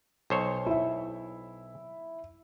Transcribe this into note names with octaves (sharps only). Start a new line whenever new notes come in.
B1 C5 C#5
E4 E5